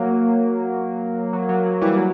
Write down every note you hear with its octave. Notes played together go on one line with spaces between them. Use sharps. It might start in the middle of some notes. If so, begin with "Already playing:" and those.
Already playing: F#3 A#3
F#3
F#3
F#3
E3 G3
F#3